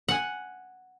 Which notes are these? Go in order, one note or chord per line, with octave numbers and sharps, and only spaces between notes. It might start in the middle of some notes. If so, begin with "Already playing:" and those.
F#5 G#5